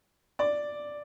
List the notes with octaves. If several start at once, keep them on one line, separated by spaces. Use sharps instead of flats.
D5